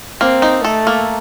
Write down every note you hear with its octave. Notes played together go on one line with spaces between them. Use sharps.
A#3 C4
D#4
A3 A4
A#3